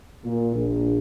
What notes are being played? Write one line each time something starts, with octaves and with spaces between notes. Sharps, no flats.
A#2
A#1